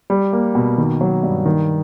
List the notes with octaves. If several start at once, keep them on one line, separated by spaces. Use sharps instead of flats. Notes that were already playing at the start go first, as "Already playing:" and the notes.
G3
A#3
B2
D#3
F#3
G2
D#3